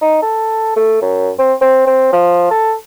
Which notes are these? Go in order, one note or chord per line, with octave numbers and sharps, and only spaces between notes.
D#4
A4
A3
F#2
C4
C4
C4
F3
A4